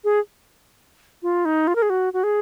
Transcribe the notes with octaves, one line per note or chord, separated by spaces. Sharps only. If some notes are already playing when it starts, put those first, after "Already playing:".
G#4
F4
D#4
F4
A#4
G#4
F#4
F#4
G#4